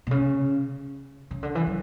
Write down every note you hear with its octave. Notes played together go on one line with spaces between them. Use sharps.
B2
C#3
C#3
D3
E3
F#3